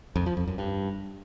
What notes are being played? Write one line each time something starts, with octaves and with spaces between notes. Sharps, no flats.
F2
F3
F2
F#2
G2